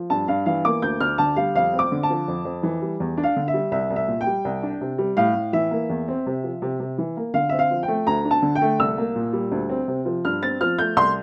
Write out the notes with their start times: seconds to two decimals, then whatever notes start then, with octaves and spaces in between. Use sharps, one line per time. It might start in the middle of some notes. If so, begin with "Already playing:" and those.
Already playing: F3
0.10 G2 A5
0.28 G2 F5
0.46 E3 F5
0.65 A#3 D6
0.82 D2 G6
1.00 D2 F6
1.18 D3 A5
1.36 G3 F5
1.55 F2 F5
1.73 C4
1.79 D6
1.92 D3
2.03 A5
2.10 F3
2.28 F2
2.45 F2
2.63 E3
2.82 G3
3.00 E2
3.17 D4
3.23 F5
3.36 D3
3.48 E5
3.54 G3
3.72 C2 E5
3.90 C2
3.96 E5
4.08 A#2
4.21 G5
4.27 G3
4.45 C2
4.63 D4
4.81 C3
4.98 G3
5.17 A2 F5
5.35 A2
5.53 E3 E5
5.71 A#3
5.90 E2
6.08 C4
6.26 C3
6.44 F3
6.62 C3
6.80 C3
6.98 E3
7.17 A#3
7.34 D3 F5
7.49 C4 E5
7.59 F5
7.71 F3
7.83 G5
7.88 A3
8.07 D2 A#5
8.25 D4
8.31 A5
8.42 D3
8.55 G5
8.62 A3
8.79 C2 E6
8.98 A#3
9.15 A#2
9.33 G3
9.51 D2
9.70 C4
9.88 C3
10.05 F3
10.25 G2 F6
10.42 C4 A6
10.60 F3 F6
10.79 A3 G6
10.97 C2 C6